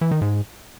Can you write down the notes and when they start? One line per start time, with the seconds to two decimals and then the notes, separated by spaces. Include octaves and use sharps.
0.01 E3
0.11 D#3
0.22 G#2